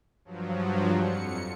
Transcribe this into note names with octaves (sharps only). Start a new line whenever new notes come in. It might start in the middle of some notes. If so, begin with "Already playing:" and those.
G2 F3 F#3
F2 C#7